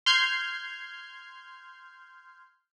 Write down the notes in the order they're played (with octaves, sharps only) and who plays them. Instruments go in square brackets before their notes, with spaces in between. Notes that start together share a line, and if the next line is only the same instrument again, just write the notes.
[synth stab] C6 F6 G6 G#6 C7